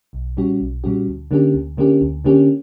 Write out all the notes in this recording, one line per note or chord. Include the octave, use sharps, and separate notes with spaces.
B1
A#2 G3 C#4 F#4
B1
A#2 G3 C#4 F#4
D2
D3 A#3 C#4 G4
D2
D3 A#3 C#4 G4
D2
D3 A#3 C#4 G4